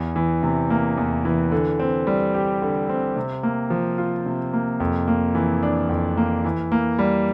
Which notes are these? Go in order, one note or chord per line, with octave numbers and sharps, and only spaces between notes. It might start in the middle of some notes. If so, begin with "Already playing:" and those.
Already playing: E2
E3
C3
A#3
E2
E3
D3
C4
G3
G4
D3
C4
C3
A#3
F3
F4
C3
A#3
F2
A#3
E3
D4
F2
A#3
E3
A#3
G3